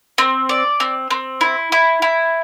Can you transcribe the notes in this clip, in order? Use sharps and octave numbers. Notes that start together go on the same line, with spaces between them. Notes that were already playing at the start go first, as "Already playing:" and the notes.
C4
D5
C4
C4
E4
E4
E4